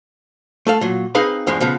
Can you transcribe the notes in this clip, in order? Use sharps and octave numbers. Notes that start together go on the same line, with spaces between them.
A3 A4 F5
A#2 F#3
C4 D#4 G#4 B4 F5 B5
E2 G2 F3 G#3
C#3 F3 B3